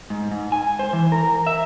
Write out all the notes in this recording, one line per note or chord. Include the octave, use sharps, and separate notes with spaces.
G#2
G#2
G#5
C5
E3
A#4
E5